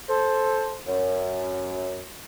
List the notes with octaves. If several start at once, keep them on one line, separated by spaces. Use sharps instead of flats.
A4 C5
F#2